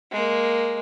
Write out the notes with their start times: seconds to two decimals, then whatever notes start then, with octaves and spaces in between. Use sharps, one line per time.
0.12 G#3 A#3